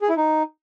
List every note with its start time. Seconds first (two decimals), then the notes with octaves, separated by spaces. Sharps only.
0.02 G#4
0.09 E4
0.17 D#4